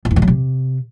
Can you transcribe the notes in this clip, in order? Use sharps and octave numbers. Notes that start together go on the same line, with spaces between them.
F2
E2
G2
F#3
C3